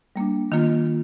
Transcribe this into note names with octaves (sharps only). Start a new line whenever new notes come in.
G3 A#3 D4
D#3 A#3 F4